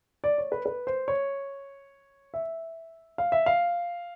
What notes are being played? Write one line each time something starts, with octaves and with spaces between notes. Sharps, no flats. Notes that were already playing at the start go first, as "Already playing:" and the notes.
D5
C#5
B4
B4
C5
C#5
E5
F5
E5
F5